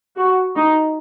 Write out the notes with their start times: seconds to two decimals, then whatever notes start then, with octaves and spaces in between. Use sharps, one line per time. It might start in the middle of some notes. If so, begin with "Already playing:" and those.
0.17 F#4
0.56 D#4